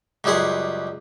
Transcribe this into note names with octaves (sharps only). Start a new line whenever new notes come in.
C#2 F#2 G3 G#4 F#5 C6